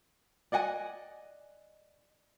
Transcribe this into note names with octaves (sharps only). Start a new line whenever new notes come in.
D5 D#5 F#5 G#5